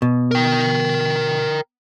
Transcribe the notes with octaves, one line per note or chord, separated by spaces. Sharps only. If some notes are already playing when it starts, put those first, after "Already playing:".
B2
A#4 G5